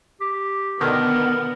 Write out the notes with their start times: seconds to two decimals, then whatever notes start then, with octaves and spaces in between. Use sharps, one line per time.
0.21 G4
0.81 B2 D3 D#3 B3 A#4